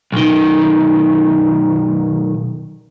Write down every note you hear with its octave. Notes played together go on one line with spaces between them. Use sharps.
B1 D#3